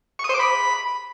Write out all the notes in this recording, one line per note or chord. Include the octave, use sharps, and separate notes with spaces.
C#6
D#6
C5
D6
B5